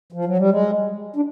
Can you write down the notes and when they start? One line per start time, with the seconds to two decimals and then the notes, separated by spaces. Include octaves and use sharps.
0.12 F3
0.25 F#3
0.37 G3
0.50 G#3
1.16 D4